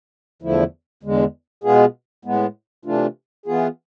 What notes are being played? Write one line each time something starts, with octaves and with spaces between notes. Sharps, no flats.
E2 D3 F3 A3 E4
E2 D3 G#3
B2 G#3 B3 F4 G#4
A2 G#3 B3
C3 E3 A3 D4 F4
E3 B3 F4 G#4